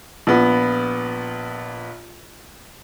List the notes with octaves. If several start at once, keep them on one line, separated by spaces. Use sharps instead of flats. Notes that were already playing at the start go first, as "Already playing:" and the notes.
A#1 B3